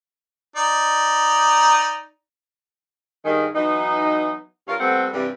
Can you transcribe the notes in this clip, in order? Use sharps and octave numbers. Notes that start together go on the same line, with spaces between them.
D#4 D5
G2 D#3 G#4
E3 F#3 B3 D#4
G2 F4 A#4 C#5 F5
G3 A3 B3 C4 A4 F#5
G2 C3 E3 G3 G4